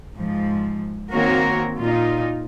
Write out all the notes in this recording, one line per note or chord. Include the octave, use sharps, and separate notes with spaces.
G#2 F3
D#3 A#3 C4 F#4 A#4 C#5
A#2 D#4 F4